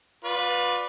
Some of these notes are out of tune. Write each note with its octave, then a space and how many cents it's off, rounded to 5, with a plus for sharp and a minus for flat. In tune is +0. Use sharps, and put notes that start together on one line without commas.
F4 +35 B4 +0 D5 +0